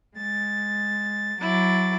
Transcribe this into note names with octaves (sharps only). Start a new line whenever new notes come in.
G#3 A6
F#3 E4 D6 A6